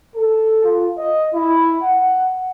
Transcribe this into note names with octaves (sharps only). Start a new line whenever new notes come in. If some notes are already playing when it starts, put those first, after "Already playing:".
A4
F4
D#5
E4
F#5